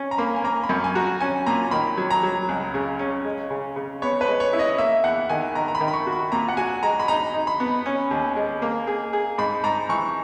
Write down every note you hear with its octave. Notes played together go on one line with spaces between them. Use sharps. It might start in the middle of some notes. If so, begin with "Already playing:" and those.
Already playing: C#4
A#5
A#3 B5
G#5
A#3 A#5
B5
F#2 C#6
G#5
F#4 A#5
C#4 G#5
A#2 A#5
D#3 B5
F#3
A#5
F#3
C#2
C#3
C#4
G#3
C#3
C#3
B3 C#5
B4
G#3
C#5
E4
D#5
A#3 E5
E2 F#5
D#3 G#5
D#3 A#5
A#5
B5
D#3
B5
C#6
F#4
B5
A#2 A#5
F#5
F#4 G#5
G#3 A#5
B5
D#4 A#5
D#4
B5
B3
C#4
D#2
G#3
A#3
G#4
G#4
G#2 B5
G#2 A#5
E3 C#6